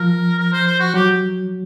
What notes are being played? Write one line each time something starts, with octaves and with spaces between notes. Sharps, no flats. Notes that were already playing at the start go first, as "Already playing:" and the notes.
Already playing: F3 A#4
A#4
C5
C5
F#4
F#3 G4